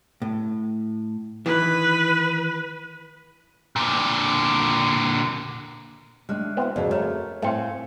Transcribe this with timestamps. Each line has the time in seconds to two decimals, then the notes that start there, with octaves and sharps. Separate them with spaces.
0.22 A2
1.46 D#3 E3 B4
3.76 A#2 D3
6.29 D#3 G#3 A3 D4 F6 F#6
6.57 G3 B3 C4 E4 F#4 C5 F5
6.76 F2 G#2 C#3 D4 F#4 G#4 A#4
6.91 A3 C#5 E5 A#5 F6
7.42 A2 A3 C4 F5 G#5 C#7